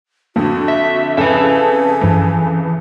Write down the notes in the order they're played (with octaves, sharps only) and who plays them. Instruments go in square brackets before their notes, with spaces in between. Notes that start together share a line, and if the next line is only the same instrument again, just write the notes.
[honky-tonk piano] F2 D3 [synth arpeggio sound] A#3 [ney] F#4
[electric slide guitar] E5 [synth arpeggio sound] A#6
[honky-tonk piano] F2 C#3 A4 [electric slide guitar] B4 E5 [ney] G#5
[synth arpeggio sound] G2 F3 B6 [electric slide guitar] E3